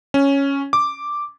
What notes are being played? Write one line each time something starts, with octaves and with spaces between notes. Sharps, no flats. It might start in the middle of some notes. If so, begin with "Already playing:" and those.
C#4
D6